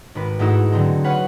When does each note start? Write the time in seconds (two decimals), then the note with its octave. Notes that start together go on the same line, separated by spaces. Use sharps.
0.15 G#1 B4
0.39 G#2 A3 D#4 E4 F#4 E6
0.72 D3 F#3 A3 C4 D#4
1.04 B4 C#5 F5 F#5 G#5